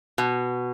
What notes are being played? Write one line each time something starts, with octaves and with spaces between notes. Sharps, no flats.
B2